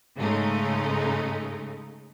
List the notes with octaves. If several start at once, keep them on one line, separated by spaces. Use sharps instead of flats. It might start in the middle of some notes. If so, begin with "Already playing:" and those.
G#2 C#3 G#3 A3 D#4